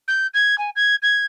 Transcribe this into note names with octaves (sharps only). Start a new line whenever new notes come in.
G6
G#6
G#5
G#6
G#6